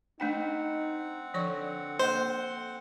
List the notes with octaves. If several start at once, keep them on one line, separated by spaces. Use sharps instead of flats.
A3 C4 D4 D#4 F#5 G5
D3 F3 C#5 C#6
A#3 C5 D#5